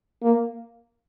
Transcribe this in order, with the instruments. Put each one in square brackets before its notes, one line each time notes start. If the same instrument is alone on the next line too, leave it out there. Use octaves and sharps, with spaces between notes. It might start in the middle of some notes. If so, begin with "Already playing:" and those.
[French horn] A#3